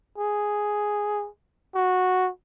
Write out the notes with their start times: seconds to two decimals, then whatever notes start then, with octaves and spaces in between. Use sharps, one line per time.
0.18 G#4
1.75 F#4